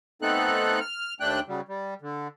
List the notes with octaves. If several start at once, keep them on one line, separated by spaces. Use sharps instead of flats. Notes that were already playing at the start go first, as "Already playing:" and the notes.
A3 B3 C4 D#4 A4 F#6
F6
D#2 A3 D4 G5 F#6
C#3 F#3 G3
G3
D3